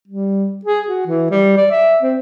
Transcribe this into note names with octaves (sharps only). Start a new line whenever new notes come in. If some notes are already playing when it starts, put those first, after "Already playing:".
G3
G#4
F#4
E3
G3
D5
E5
C4